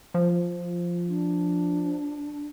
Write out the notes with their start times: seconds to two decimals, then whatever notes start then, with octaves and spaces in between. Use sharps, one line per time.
0.14 F3
1.08 D4